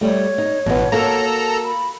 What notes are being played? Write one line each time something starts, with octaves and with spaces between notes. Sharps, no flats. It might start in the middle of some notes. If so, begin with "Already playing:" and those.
G3 A3 C#5
D#4
A1 B2 B3
A#3 F#4 A4 A#4 A#5
B5